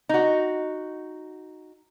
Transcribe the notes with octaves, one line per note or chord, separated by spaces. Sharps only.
D#4 F#4